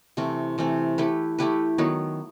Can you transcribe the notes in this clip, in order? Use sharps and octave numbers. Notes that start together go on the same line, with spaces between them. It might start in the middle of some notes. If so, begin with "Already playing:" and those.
C3 E3 A3 C4
C3 E3 A3 C4
A3 E4 G4 B4
A3 E4 G4 B4
D#3 F#3 B3